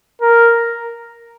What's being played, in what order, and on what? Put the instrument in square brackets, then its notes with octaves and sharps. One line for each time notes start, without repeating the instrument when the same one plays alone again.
[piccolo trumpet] A#4